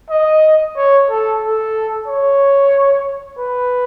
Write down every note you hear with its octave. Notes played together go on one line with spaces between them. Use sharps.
D#5
C#5
A4
A4
C#5
B4